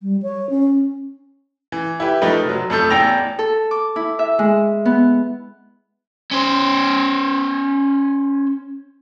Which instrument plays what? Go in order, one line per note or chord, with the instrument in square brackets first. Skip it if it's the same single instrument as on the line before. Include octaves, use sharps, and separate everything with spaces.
[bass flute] G3
C#5
C#4
[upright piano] E3
E4 G4 B4
F3 A3 D#4 A#4 B4
F1 F#3
F2 A3 A4 G6
A1 E2 G5 E6 A#6 F7
[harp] A4
D6
E4
E5
G#3
B3
[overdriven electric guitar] C#4 C5